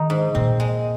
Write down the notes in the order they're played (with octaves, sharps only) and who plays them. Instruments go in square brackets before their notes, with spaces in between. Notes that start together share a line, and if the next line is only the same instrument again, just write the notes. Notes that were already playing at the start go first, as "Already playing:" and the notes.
Already playing: [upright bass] D#3 [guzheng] G#3 D#4
[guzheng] G#2
[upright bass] A#2 [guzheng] C4
[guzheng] G#3